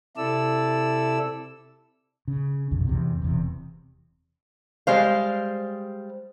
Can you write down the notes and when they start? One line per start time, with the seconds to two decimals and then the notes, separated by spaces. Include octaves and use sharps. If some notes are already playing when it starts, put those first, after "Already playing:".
0.17 C3 E4 A4 D5 E6
2.28 C#3
2.71 B1 F2 D3
2.87 E2 C3
3.22 E1 E2 C3
4.87 G3 G#3 C5 F5